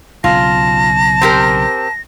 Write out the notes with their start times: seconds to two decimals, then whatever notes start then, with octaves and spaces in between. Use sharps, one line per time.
0.24 B1 C#3 F4 A5 A#6
1.21 C4 G4 A#4